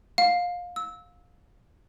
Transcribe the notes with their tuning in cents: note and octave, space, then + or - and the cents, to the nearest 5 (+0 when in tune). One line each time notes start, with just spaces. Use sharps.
F5 +25
E6 -20